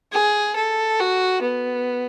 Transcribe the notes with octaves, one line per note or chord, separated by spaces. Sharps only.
G#4
A4
F#4
B3